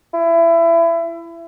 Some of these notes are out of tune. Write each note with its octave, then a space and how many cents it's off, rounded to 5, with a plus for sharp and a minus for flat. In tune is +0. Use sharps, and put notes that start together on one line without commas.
E4 +25